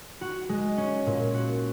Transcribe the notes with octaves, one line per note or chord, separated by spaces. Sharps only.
F#4
G#3
C#4
A#2
F#4